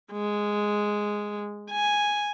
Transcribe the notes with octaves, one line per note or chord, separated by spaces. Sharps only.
G#3
G#5